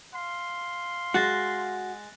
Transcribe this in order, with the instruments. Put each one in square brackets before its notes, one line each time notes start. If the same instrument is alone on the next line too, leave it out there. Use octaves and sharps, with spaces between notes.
[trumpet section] F5 C6
[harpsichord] G#3 [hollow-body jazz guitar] F#4 [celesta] F#6 A6 A#6